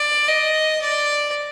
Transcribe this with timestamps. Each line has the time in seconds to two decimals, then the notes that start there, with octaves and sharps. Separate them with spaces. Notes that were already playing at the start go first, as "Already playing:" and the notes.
Already playing: D5
0.28 D#5
0.82 D5